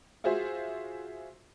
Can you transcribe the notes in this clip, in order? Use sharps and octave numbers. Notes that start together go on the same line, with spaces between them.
F4 F#4 G#4 C5 E5